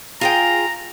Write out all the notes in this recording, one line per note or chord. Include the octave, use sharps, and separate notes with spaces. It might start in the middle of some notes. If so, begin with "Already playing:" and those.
F4 G#4 G5 A#5